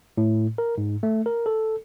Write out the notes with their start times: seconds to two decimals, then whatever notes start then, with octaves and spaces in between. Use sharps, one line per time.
0.18 A2
0.58 A#4
0.78 G#2
1.03 A3
1.26 A#4
1.46 A4